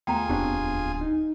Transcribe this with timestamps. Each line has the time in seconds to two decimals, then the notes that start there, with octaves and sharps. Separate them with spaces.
0.07 D#2 A3 B3 F4 G#4 G5 G#5 A#5
0.29 D1 E2 B3 C4 D4 G4
1.01 D#4